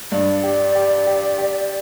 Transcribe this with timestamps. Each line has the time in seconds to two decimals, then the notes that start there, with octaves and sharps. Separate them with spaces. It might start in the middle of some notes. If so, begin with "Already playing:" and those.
0.12 G2 D5
0.43 G4
0.75 G4
1.07 G4
1.38 G4